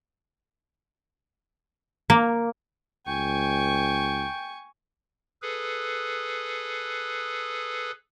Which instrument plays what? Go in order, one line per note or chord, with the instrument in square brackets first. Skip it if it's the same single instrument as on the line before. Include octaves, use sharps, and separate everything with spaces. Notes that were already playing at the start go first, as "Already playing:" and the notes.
[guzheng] A#3
[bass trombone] C#2 [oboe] G5 [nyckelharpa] G#5 C#6
[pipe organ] G#4 A4 B4